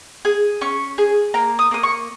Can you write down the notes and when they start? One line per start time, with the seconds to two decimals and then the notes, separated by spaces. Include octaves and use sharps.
0.25 G#4
0.61 C#4 C#6
0.98 G#4
1.34 A#3 A#5
1.59 D#6
1.71 A#3 D#6
1.83 C#6